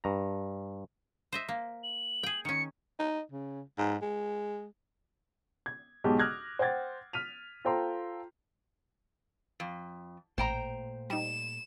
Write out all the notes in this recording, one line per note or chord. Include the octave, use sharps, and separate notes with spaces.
G2 A#5
C5 D#5 E5
A#3
F#7
G#4 G5
D#3 C#4 C#7
D#4
C#3
G#2
G#3
G#6
B1 G#2 G#3 G4 A5 G6
D6 D#6 F6 F#6 G#6 A#6
C5 F#5 G5 G#6 A6
F6 B6 D#7 F7
F4 A4 C5 G5 A#5 C6
F2
A1 A#2 A3 C5 G5 A#5
G3 D#4 E7